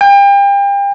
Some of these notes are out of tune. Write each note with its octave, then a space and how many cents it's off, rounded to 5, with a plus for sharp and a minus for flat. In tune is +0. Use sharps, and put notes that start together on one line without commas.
G5 +35